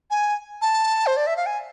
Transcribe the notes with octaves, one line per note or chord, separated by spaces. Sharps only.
G#5
A5
C5
D5
E5
F5
G#5